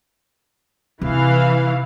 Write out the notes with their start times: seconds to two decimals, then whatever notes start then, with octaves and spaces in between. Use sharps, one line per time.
1.01 C3 E3 F5